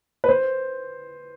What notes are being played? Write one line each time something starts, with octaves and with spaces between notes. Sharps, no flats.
B4
C5